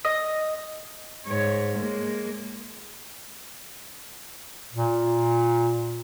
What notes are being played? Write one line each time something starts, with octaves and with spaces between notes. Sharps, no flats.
D#5
G#2 C#5
G#3 A#3
A#2